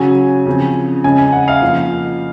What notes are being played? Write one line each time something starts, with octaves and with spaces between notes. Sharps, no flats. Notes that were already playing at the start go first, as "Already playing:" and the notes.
Already playing: C#3 F#3 C#4 G#5
C#3 F3 C4
C#3 G#3 C#4 G#5
G#5
F#5
F5
F2 C#3 F3 A#3